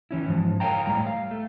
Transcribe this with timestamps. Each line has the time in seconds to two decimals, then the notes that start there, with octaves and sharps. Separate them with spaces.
0.11 E3 C#4 E4
0.28 G#2 F3
0.60 A#4 C#5 E5 F5 G5 A#5
0.86 A2 G3 A#5
1.07 F5
1.31 A3